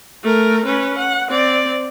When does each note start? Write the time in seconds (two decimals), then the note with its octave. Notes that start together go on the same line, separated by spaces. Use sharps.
0.23 A3 A#4
0.65 C#4 B4
0.99 F#5
1.29 C4 D5